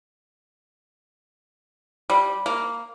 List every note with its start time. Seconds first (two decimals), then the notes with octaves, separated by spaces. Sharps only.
2.10 G3
2.46 A#3